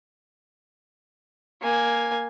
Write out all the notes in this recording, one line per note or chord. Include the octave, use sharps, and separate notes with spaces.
A#3 G#5